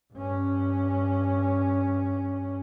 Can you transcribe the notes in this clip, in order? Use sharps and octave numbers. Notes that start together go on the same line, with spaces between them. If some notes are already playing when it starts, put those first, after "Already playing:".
G2 C#4